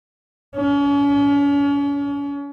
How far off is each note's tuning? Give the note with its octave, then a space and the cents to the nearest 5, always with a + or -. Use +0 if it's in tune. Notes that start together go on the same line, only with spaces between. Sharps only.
C#4 +40